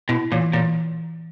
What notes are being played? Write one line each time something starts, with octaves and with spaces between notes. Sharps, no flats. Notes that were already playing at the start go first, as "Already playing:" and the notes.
B2 E4
A#2 E3
A#2 E3